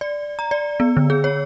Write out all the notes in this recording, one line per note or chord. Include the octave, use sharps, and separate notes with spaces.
D5
A#5
D5
B3
D3
G#4
C#5